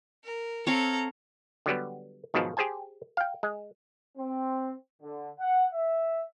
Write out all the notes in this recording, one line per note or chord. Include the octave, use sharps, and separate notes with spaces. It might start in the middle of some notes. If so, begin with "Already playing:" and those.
A#4
C4 A4 C#5 F5 A#5
D3 F#3 G3 B3
B1 G#2 B2 D#3 F3 A5
G4 G#4 C5 G#5 A5
F5 G5
G#3
C4
D3
F#5
E5